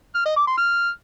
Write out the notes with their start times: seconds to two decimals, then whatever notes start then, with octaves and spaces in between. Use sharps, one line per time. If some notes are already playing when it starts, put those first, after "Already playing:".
0.15 F6
0.25 D#5
0.36 D6
0.47 C6
0.58 F6